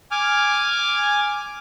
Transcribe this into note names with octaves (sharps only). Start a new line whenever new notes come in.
G#5 D6 F6